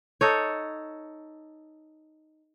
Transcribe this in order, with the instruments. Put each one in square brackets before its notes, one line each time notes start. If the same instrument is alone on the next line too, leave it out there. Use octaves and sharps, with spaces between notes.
[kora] D#4 A4 C#5